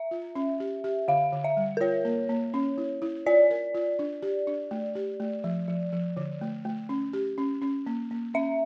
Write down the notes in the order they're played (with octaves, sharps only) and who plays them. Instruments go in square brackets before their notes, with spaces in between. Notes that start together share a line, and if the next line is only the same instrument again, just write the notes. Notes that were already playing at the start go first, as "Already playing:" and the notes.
Already playing: [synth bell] E5
[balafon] F4
C#4
G4
G4
[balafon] D3 [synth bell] F5
[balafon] D3
[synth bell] E5
[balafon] G3
[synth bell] A#4
[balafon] F4 [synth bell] C#5
[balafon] A#3
A#3
C#4
E4
E4
[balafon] F4 [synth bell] D5
[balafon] A#4
F4
D4
G4
D4
A3
G4
A3
F3
F3
F3
D3
A3
A3
C#4
G4
C#4
C#4
A#3
A#3
[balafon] C#4 [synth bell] E5